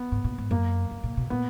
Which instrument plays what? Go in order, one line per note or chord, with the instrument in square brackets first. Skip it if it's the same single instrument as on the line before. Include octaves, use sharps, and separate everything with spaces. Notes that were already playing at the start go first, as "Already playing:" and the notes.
Already playing: [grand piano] B3
[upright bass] G#2
A#2
G#2
[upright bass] F#2 [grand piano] A#3
[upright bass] F#2
A#2
B2
[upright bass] A#2 [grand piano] B3